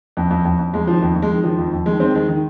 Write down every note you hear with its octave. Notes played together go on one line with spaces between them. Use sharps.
F2
F2
F2
F2
F2 G#3
D#3 F3
F2
F2
G#3
D#3
D#3 F3
F2
F2
D#3 G#3
D#3 G#3 C4
D#3 G#3
D#3